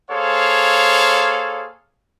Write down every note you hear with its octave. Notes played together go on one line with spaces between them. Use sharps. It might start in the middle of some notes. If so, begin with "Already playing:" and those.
A#3 G#4 A4 C5 C#5 F5